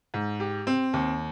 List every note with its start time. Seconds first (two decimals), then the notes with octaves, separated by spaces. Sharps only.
0.14 G#2
0.40 G4
0.67 C4
0.93 D#2